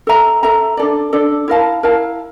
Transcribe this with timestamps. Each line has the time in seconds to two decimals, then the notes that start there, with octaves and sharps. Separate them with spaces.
0.07 A4 E5 A#5
0.43 A4 E5 A#5
0.77 D4 A4 D5
1.13 D4 A4 D5
1.48 E4 A#4 F5 A5
1.83 E4 A#4 F5 A5